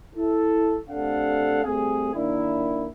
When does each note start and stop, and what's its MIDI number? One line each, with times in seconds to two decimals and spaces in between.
0.15 0.77 64
0.15 0.77 69
0.89 1.63 48
0.89 1.63 57
0.89 1.63 62
0.89 1.63 69
0.89 1.63 77
0.89 1.63 78
1.64 2.13 55
1.64 2.13 57
1.64 2.13 60
1.64 2.13 68
2.14 2.86 51
2.14 2.86 58
2.14 2.86 62
2.14 2.86 64